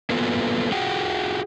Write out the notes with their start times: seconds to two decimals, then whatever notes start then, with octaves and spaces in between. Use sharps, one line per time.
0.10 A#3 B3 F4 F#4 A4 B4
0.72 F4 F#4 G#4 F#5 G5